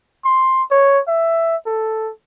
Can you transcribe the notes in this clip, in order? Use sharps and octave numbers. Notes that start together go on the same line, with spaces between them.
C6
C#5
E5
A4